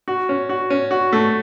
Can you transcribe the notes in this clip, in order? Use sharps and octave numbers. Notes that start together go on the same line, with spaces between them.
F#4
C#4
F#4
C#4
F#4
A3